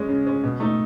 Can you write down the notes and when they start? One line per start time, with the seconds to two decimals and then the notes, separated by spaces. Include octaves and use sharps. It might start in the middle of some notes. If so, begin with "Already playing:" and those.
Already playing: G#3 C#4
0.09 C#3
0.27 G#3 C#4
0.43 B2
0.60 A3 D#4